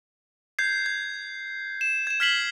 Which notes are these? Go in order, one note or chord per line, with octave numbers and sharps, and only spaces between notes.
G6 G#6 C7
G#6
E7
G#6 E7
F6 G#6 B6 C7 F#7 G7